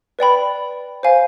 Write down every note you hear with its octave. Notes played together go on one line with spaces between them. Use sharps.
B4 D5 G5 B5
C5 F5 G#5